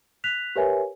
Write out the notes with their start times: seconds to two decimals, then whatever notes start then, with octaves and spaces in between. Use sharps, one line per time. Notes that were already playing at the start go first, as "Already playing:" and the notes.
0.24 F#6 B6 F7
0.56 G4 A#4 B4 C#5 E5 G#5